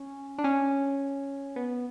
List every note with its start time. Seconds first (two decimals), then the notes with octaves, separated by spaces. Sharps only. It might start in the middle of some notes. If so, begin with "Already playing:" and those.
Already playing: C#4
0.38 D4
0.44 C#4
1.56 B3